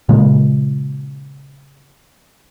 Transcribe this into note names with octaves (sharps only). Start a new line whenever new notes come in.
A#2 C#3 G#3